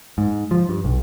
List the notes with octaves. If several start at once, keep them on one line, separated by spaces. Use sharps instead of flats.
G#2
F3
G2
B1